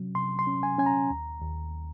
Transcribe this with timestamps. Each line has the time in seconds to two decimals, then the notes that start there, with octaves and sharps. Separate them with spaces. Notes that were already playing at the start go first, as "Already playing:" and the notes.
Already playing: C3 F#3 C#4
0.15 C3 C6
0.39 C6
0.47 C#4
0.63 G#5
0.78 C#4 G#5
0.86 A#5
1.10 D#2
1.42 D#2